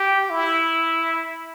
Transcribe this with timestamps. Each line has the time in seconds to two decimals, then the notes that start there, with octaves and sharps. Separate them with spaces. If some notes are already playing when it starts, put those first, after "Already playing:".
Already playing: G4
0.30 E4